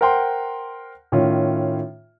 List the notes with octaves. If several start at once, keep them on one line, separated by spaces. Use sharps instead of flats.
A#4 C5 F#5 G5 C6
A2 D#3 C#4 F4